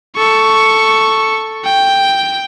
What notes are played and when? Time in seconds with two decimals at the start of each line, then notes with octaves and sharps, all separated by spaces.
0.16 A4 C#6
1.64 G5